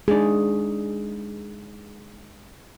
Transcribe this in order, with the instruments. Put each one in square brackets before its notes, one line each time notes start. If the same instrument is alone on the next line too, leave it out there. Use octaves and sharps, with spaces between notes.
[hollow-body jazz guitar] G#3 D4 D5 [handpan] D#4 G#4